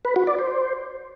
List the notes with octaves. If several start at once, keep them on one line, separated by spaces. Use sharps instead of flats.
B4
F#4
D5
C5